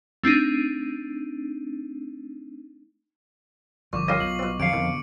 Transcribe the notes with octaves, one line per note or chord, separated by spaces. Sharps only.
A3 C4 D4 D#4
G1 A#2 F3 C#6 D6
A#3 C#4 F4 G4 D#5
B1 F#7
B2 C4
F2 D3 F#3 F5 C#7 D7
B2 D3 D#3